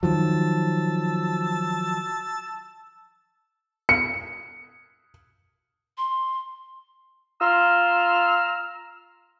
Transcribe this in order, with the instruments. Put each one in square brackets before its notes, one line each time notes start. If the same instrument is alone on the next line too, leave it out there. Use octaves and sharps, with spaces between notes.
[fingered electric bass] D#3 F3 F#3 [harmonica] A5 E6
[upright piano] C#7
[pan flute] C6
[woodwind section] F4 A#5 C6 E6 F6